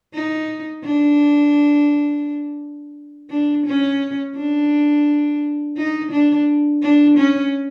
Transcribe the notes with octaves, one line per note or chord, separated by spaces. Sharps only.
D#4
D4
D4
C#4
D4
D#4
D4
D4
C#4